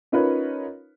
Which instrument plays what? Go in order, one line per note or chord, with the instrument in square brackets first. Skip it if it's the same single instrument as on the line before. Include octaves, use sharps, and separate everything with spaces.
[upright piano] C#4 D#4 F4 A#4 B4 C#5